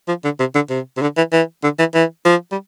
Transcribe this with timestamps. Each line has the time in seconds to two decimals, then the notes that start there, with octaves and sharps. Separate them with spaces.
0.08 F3
0.24 D3
0.40 C3
0.55 D3
0.70 C3
0.97 C3
1.02 D3
1.17 E3
1.32 E3
1.64 D3
1.79 E3
1.95 E3
2.25 F3
2.52 G3